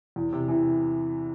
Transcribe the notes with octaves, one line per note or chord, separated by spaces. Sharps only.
E2
C3
E3